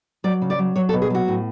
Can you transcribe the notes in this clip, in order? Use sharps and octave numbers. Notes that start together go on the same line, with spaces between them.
F#3 D5
C#3
D5
F#3
F#3 C#5
A4
B2
G#4
F#3 F#4
A2